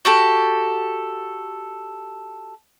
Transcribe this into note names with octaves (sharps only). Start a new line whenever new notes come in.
F#4 G4 A4